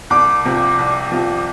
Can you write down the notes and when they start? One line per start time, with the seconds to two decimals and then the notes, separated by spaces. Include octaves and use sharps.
0.10 C2 D6
0.45 C3 F3
0.79 C2
1.12 C3 F3